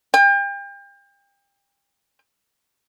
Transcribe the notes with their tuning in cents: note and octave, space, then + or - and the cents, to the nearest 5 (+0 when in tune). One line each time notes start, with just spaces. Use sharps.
G5 +35